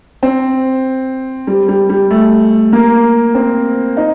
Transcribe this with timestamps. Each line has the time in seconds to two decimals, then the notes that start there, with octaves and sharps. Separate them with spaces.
0.23 C4
1.47 G3
1.68 G3
1.89 G3
2.11 A3
2.73 A#3
3.35 C4
3.97 D#4